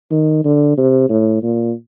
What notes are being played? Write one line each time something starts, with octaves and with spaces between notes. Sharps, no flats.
D#3
D3
C3
A2
A#2